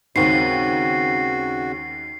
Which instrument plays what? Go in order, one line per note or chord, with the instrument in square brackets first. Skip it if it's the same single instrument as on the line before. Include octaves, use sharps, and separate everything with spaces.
[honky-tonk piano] D#2 G#2 [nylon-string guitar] C#3 C4 [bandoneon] F#4 [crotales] C7